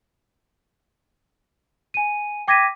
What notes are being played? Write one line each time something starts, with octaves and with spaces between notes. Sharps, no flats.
G#5 D#7
G5 D6 G#6 A#6 B6 D#7